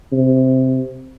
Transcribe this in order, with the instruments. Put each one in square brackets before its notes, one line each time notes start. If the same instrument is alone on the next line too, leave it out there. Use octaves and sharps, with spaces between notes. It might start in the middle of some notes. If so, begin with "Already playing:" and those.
[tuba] C3